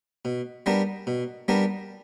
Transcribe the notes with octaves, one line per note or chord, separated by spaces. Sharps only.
B2
G3 B3 D4 A#4
B2
G3 B3 D4 A#4